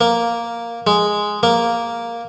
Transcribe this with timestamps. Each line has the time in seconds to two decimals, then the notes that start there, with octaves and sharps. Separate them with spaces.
0.01 A#3
0.87 G#3
1.43 A#3